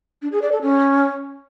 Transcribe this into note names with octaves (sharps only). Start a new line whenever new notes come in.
D4
G#4
D5
A4
C#4